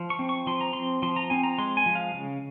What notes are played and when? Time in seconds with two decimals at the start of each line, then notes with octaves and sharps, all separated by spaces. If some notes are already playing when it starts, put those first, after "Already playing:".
Already playing: F3
0.10 C#6
0.19 C4
0.29 C#6
0.47 F3 C6
0.61 A#5
0.73 C4 C6
1.02 F3 C6
1.16 A#5
1.30 C4 G#5
1.43 A#5
1.58 G#3 C6
1.77 G#5
1.86 F3
1.95 F5
2.14 C#3